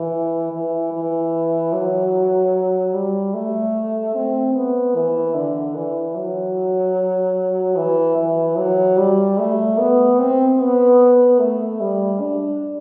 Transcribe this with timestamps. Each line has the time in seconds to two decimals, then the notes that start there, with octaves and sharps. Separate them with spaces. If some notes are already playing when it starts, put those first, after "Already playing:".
Already playing: E3
0.52 E3
0.92 E3
1.73 F#3
2.93 G3
3.34 A3
4.15 C4
4.54 B3
4.95 E3
5.34 D3
5.75 E3
6.15 F#3
7.76 E3
8.16 E3
8.57 F#3
8.97 G3
9.38 A3
9.78 B3
10.19 C4
10.59 B3
11.40 A3
11.80 G3
12.20 D4